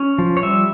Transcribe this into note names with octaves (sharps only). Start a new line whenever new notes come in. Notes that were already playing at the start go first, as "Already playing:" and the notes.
Already playing: C#4
F3
C#5
G3 E5